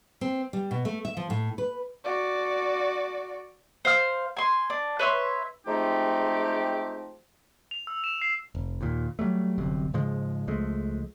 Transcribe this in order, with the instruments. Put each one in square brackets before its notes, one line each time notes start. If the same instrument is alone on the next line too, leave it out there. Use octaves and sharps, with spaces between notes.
[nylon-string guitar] C4
G3
B2
A3
E5
F3
A2
B4
[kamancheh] F#4 D5
[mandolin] C5 F5 F6
G#5 C6
D4
B4 C#5 E5 C6
[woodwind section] F3 G#3 A3 C4 D#4 G4
[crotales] F7
E6
E7
C7
[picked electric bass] F1
D#2 A#2
F#3 G3 A3
G1 C2 F#2 C3
G#2 C#3 F3 G#3
C#2 F3 G#3 A3